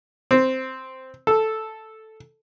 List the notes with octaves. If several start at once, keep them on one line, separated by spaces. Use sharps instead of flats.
C4
A4